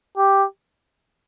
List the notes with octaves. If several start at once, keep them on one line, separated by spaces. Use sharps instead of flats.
G4